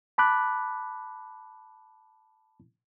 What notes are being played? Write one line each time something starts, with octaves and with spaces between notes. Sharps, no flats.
A5 B5 D6 F#6